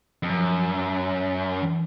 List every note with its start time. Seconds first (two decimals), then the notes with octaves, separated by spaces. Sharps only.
0.23 F2
0.29 F#2 F3
1.62 E3